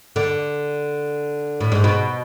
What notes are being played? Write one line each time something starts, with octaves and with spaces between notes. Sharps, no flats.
D3
A2
G#2
B2